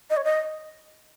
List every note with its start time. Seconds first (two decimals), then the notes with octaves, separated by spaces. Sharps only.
0.10 D#5
0.17 C#5
0.24 D#5